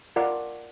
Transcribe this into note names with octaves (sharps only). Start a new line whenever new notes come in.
F4 A#4 D5 F#5